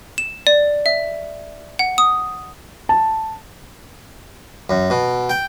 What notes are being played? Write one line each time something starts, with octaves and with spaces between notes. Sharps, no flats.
E7
D5
E5
F#5
D#6
A5
F#2
B2
G5